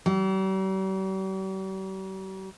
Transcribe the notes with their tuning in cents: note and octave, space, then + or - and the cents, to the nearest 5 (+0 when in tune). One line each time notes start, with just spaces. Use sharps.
G3 -45